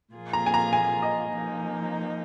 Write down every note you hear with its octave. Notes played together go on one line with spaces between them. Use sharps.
A#2 F3 A#3 F4 G#4
A#5
G#5
A#5
G#5
D#5
F3 A#3 D#4